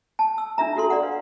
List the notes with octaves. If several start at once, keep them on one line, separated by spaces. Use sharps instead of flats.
A5
E6
D4 F4 E5 A#5
F4 F#4 A4 C6
D5 F#5
B4 F5